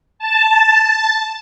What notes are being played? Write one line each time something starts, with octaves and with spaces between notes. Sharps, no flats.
A5